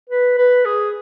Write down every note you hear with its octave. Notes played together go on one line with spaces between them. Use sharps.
B4
B4
G#4